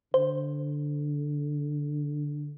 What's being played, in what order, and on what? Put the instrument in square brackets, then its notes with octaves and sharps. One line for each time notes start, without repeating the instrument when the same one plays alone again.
[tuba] D3 [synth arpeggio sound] C5